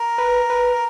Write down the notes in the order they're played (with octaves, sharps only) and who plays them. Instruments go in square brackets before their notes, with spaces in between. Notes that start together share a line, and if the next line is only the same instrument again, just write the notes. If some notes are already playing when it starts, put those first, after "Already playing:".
Already playing: [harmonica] A#4
[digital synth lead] B4
B4